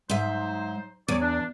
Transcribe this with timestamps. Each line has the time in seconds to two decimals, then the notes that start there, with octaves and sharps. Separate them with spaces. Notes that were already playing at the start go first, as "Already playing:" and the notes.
0.10 G#2 F#3 D#4 C5 E5
1.08 E2 C#5 D5
1.21 D4